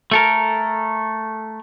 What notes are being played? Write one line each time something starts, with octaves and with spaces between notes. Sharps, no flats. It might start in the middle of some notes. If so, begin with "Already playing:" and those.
A3 A4 A#4